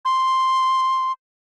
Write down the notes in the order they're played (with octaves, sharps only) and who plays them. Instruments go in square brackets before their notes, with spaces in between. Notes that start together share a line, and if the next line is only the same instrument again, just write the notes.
[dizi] C6